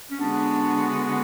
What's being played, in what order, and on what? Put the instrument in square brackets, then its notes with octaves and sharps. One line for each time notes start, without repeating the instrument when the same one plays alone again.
[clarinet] C#4
[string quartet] D3 G#3 B3 F#4 [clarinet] D4